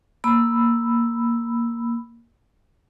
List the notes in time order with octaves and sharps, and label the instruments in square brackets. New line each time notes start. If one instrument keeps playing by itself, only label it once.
[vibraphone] A#3 B5 E6